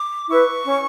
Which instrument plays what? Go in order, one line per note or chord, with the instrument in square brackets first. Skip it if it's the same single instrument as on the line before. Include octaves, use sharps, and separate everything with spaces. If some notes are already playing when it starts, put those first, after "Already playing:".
Already playing: [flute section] D6
E4 B4 C#6
C#4